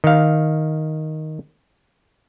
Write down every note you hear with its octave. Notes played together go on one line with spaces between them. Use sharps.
D#3 F5